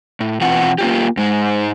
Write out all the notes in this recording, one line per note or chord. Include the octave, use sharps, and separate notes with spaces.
A2
B2 E3 C4 F4 F#5
A#3 F4 G4
G#2 G#3